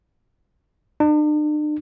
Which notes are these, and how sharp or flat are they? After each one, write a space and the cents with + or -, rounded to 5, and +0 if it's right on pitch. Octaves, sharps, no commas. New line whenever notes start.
D4 +45